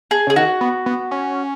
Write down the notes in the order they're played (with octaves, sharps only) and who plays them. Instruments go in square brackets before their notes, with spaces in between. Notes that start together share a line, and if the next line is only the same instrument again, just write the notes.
[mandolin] G#4
[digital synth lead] C#3 [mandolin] G#4
[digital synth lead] D#3 [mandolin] F#4
[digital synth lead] B3
B3
C#4